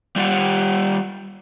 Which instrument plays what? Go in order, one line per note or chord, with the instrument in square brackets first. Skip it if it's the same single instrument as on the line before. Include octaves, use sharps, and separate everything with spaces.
[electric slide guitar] G3 F4 G4 F#5